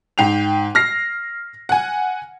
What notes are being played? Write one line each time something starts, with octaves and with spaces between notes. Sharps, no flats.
G#2 G5 C7 F7
F6 A#6 C7
F#5 G#5